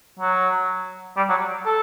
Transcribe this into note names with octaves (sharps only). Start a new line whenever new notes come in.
F#3
G3
F#3
A4